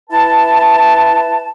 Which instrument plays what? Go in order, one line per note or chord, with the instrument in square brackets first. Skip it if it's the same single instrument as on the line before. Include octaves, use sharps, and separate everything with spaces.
[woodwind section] E4 B4 A5